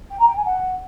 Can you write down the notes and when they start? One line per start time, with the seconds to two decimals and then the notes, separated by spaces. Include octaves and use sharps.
0.10 G5
0.19 A#5
0.27 G5
0.36 G#5
0.45 F#5